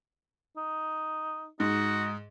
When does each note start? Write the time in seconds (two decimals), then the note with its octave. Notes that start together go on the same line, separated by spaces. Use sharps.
0.57 D#4
1.60 G#2 D#4 F#4